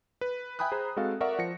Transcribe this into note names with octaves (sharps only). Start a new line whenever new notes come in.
B4
E5 G5 G#5 B5 D#6 F#6
G#4 C5 A#5 B5
G#3 C4 F#4 A4 F5
A#4 D5 E5 F#5 C#6
F3 A#6 C#7